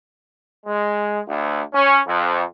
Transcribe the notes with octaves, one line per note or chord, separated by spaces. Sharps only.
G#3
D2
C#4
F2